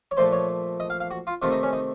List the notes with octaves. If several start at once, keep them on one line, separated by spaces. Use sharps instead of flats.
C#5
A#2 F3 A3 C5
C#5
D#5
F5
F5
F#4
F4
C3 D#3 A3 F4
D#4
C#4
D#4